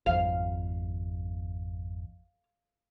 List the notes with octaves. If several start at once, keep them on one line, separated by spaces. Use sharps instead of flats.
G#1 F2 F5